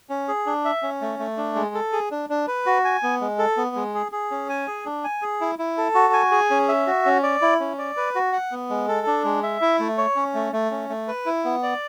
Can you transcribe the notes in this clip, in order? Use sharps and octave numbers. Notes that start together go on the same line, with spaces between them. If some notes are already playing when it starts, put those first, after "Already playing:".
C#4
G#4
D4
E5
C#4
A3
A3
D4
G#3
A4
G#4
D4
D4
B4
F#4
G#5
B3
G#3
A4
B3
G#3
G#4
G#4
C#4
G#5
G#4
D4
G#5
G#4
E4
E4
A4
F#4
G#5
G#4
C#4
E5
F#4
C#4
D5
E4
C#4
D5
B4
F#4
F#5
B3
G#3
A4
D4
G#3
E5
E4
A3
C#5
C#4
A3
A3
C#4
A3
B4
E4
B3
D5